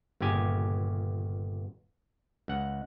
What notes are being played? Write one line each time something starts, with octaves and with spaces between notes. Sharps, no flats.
G1 A#2 C#3 G4 G#5
C#2 F#5